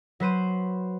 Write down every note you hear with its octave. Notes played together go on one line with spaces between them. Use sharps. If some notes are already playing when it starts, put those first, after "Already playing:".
F#3 B4 C5 D#7